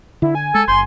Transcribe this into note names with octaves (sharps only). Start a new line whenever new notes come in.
D3 E4
G#5
G#3 A4
F#1 C6